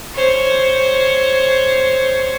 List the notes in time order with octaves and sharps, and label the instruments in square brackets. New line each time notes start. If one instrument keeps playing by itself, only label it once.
[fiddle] C5 C#5